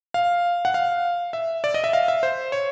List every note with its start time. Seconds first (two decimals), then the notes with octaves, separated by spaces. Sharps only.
0.14 F5
0.65 F#5
0.74 F5
1.33 E5
1.64 D5
1.74 D#5
1.84 E5
1.93 F5
2.08 E5
2.23 C5
2.52 C#5